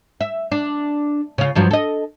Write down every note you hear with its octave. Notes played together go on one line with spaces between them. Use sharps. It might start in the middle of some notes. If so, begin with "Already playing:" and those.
E5
D4
C#3 F4
G2 F3 F#3
A4 D#5